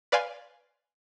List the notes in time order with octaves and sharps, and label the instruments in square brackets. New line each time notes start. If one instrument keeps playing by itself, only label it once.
[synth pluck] B4 D5 F5 G#5 C6